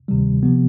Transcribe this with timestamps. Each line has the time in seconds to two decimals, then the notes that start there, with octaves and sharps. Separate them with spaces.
0.08 D2 C3 D#3 G3
0.43 C3 F3 B3